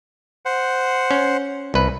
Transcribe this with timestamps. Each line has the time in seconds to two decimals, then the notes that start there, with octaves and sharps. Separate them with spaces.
0.45 C5 F#5
1.11 C#4
1.74 C2 B4